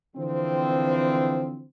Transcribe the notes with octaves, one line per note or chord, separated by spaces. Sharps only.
D3 E3 F3 C4